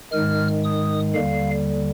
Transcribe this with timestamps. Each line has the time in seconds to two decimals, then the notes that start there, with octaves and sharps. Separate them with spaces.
0.12 G#2 D#3 G#3 F6
0.64 D#6
1.14 D#2 D3 G3 F5